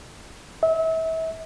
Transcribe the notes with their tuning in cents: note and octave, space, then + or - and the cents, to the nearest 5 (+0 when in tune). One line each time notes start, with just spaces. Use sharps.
E5 -35